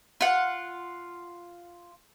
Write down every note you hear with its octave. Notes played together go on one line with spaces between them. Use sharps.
F4 F#5